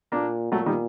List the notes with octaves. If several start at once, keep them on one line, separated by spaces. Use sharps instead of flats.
A#2 A#3 D4
A#2 F#3 A3
D#3 G3